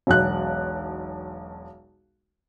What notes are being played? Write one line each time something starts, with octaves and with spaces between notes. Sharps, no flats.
E1 B1 F#6